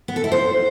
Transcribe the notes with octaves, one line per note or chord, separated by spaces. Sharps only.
B3
A4
E4
C5